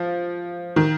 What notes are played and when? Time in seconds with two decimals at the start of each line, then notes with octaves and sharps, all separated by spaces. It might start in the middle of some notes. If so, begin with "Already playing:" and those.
Already playing: F3
0.76 D#3